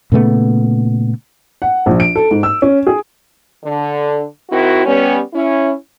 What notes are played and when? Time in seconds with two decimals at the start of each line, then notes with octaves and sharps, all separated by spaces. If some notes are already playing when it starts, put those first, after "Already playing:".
0.12 A#2 C#3 A3 B3
1.62 F#5
1.86 A#1
2.00 D7
2.16 A4
2.31 G#2
2.43 E6
2.62 C#4
2.87 G#4
3.64 D3
4.50 D#3 C4 E4 F#4
4.85 G3 B3 C#4
5.34 C#4 E4